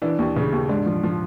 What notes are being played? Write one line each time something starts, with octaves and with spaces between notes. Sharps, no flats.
E3 D4
D#2
C#3
D#2
G#2 D4
F3
F3